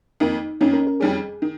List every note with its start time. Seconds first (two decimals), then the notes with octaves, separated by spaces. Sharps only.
0.20 F2 D#3 A#3 D#4
0.61 F2 D#3 A#3 C#4
0.73 A#4
0.87 A#4
1.00 F2 D#3 G3 C#4 G#4
1.42 D#3